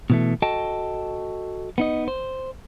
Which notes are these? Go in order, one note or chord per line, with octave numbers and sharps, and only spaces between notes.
B2 E3 A3
F#4 A4 D#5 G5 A5
B3 D#4 D#5
C5